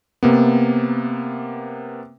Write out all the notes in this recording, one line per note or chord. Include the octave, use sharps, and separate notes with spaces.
C3 A#3 B3